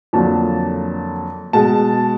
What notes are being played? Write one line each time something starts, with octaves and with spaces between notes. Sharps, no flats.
F2 D3 F#3 A#3 A5
B2 G#3 A5